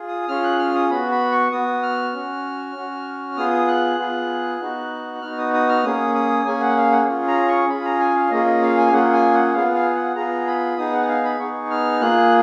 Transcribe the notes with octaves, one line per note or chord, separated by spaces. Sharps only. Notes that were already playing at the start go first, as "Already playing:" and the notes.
Already playing: F4 G#4
D#6
C#4 F4 G#4 F6
F#6
F6
D#6
B3 F#4 B5
B5
C#6
B3 F#4 D#6
F6
C#4 F#4
C#4 F#4
B3 F4 G#4 D#6
F#6
B3 F4 G#4
B3 D#4 F#4
B3 D#4 F#4 F6
D#6
D#6
F6
A#3 C#4 G#4 D#6
D#6
A#3 C#4 G#4 G#5
F#5
F5
F#5
C#4 F4 G#4
A#5
C#6
C#4 F4 G#4 B5
A#5
G#5
F5
A#3 C#4 F4 G#4 D#5
D#5
F5
G#5
F5
A#3 C#4 F4 G#4 F#5
G#5
F#5
B3 F4 G#4 F5
F5
F#5
B3 F4 G#4 A#5
B5
B3 D#4 G#4 D#6
F#5
F5
B5
B3 D#4 G#4 C#6
F6
A#3 F4 G#4 F#6